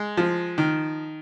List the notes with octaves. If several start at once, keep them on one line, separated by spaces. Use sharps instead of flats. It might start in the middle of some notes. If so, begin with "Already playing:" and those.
Already playing: G#3
F3
D#3